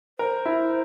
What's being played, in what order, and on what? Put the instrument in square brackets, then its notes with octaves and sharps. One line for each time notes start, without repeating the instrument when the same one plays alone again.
[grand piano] A#4 [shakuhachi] C5
[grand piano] E4